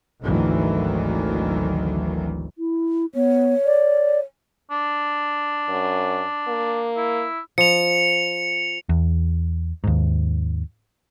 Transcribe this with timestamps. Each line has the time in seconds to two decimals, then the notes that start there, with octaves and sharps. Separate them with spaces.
0.23 G#1 D2 D#3 E3 F#3
2.57 E4
3.15 B3 C#5
3.66 D5
4.71 D4
5.69 F#2
6.48 A#3
6.96 E4
7.58 F3 C#7 F7
8.89 E2
9.84 D#2 G#2